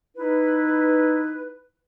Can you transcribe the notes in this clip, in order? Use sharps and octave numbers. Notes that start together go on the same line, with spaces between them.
D#4 E4 B4